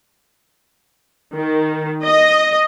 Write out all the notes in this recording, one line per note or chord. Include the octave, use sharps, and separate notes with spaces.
D#3
D#5